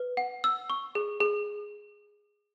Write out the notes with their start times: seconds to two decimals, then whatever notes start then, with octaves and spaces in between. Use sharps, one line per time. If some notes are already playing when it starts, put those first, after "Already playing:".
Already playing: B4
0.17 F#5
0.44 E6
0.70 C#6
0.95 G#4
1.20 G#4